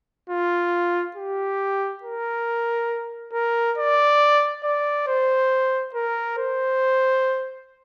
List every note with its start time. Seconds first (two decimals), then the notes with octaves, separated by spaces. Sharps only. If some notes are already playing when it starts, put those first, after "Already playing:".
0.30 F4
1.16 G4
2.03 A#4
3.33 A#4
3.78 D5
4.64 D5
5.07 C5
5.94 A#4
6.38 C5